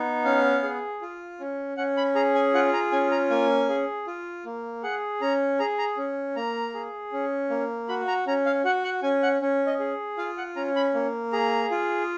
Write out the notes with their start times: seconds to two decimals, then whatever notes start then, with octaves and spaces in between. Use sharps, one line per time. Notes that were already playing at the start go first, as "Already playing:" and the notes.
Already playing: B3 D#4
0.24 C#4 F5
0.63 G#4
1.01 F4
1.40 C#4
1.77 C#4 F#5
1.97 B5
2.15 G#4 A#5
2.35 G#5
2.54 F4 F#5
2.73 A#5
2.92 C#4 G#5
3.11 A#5
3.30 A#3 G#5
3.69 G#4
4.07 F4
4.45 A#3
4.83 G#4 F#5
5.21 C#4 A#5
5.59 G#4 A#5
5.78 A#5
5.97 C#4
6.36 A#3 A#5
6.74 G#4
7.12 C#4
7.50 A#3
7.89 F#4 B5
8.08 A#5
8.27 C#4 A#5
8.46 F5
8.65 F#4 F#5
8.84 F#5
9.03 C#4 G#5
9.22 F#5
9.42 C#4
9.66 D#5
9.79 G#4
10.18 F4 F5
10.37 F#5
10.56 C#4 A#5
10.76 B5
10.94 A#3
11.32 G#4 A#5
11.71 F4